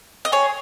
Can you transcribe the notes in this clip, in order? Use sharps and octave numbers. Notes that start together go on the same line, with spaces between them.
D#5
G#4 C#5